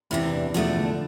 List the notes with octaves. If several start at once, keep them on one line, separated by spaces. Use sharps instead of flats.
E2 C3 E3 E4
D4
E2 B2 F3 A3 D4
D3